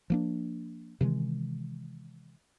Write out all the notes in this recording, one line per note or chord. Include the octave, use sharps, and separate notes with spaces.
F3 A#3 D4
C3 D#3 E3 G#3